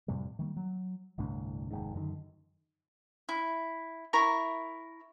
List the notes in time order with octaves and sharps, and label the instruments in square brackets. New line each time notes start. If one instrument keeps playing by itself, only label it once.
[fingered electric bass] F2 A2 C3 G3
D#3 G3 A#3
F#3
G1 C2 A2 D4
F1 D#2 G#2
F#2 D3 D#3
[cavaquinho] E4
E4 A#4 A#5 C#6